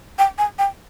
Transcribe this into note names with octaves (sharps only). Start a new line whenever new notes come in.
G5
G#5
G5